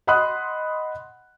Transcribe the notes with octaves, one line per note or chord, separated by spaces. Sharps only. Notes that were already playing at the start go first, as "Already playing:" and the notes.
D#5 F#5 B5 C6 D#6 F#6